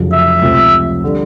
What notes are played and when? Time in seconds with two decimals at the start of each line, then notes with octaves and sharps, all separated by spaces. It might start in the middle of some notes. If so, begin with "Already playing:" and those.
Already playing: F1 F2 C#3 F#3
0.12 E5
0.42 C#2 C3 F3 A3 C4
1.04 D3 G3